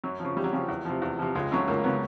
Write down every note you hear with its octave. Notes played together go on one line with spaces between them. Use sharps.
F#2 F#3
C#3 F3
F#2 G3
F#3
C#3 F3 G3
E2
C3 F3
E2
C3 F3
C#2 G#3
C#3 F#3 A3
C#2 A#3
C#3 F#3 B3